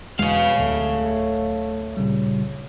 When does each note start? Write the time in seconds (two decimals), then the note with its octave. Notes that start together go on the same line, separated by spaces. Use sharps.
0.19 E1 B2 G#3 C#5 F5
0.58 D1 A3
1.97 A#2 C#3 G3